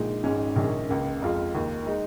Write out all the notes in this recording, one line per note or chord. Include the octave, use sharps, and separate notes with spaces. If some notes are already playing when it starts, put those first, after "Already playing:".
Already playing: A#1 A#2 G#3 D#4
G#1 G#2 G#3 C#4
A#1 G#2 D#3 C#4 G#4
C#2 C#3 A#3
F2 F3 G#3 F4
D#2 D#3 A#3
G#3 D#4